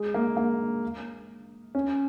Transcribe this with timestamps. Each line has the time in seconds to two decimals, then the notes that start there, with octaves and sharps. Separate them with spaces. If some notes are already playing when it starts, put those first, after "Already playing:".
Already playing: G#3
0.14 A#3
0.37 A#3
1.75 C#4